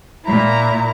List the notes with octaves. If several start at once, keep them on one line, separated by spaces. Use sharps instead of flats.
A#2 E4 A#5